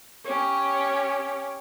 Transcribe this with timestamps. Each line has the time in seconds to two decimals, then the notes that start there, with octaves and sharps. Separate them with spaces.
0.25 C#4 G4 C#5